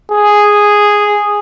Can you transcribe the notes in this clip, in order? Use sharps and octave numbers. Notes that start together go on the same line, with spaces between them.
G#4